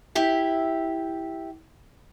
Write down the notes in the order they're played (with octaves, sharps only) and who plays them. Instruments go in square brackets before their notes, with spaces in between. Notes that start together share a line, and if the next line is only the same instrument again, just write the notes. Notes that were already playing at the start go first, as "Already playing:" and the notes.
[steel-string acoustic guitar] E4 G4 E5